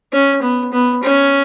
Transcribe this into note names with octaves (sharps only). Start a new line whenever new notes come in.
C#4
B3
B3
C#4